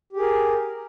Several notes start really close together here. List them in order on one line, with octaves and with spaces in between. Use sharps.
G4 G#4 A#4